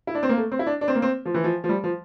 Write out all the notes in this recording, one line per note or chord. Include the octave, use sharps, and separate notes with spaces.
E4
D4
C4
A#3
A3
C4
E4
D4
D4
C4
A#3
C4
F3
E3
F3
F3
G3
F3